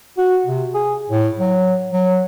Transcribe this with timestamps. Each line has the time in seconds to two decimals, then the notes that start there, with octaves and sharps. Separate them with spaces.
0.18 F#4
0.46 C3
0.74 G#4
1.10 A2
1.39 F#3
1.92 F#3